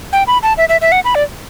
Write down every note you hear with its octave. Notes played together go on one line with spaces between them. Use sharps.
G5
B5
A5
E5
E5
E5
F#5
B5
D5